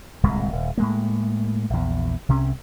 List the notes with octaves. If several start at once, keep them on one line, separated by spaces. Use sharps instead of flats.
D1 C2 A#2 G#3
D#1
A2 G#3 A#3
A#1 E2
C2 C3 C#4